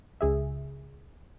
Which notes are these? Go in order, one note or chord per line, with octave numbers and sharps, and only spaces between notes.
C#2 G#4 E5